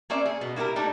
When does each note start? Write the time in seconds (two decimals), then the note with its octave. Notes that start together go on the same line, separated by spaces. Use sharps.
0.10 A#3 C4 C#4 D5 E5
0.26 G#4
0.41 B2
0.56 A#3 E4 F#4 G4 A#4
0.76 A3 D4 D#4 G4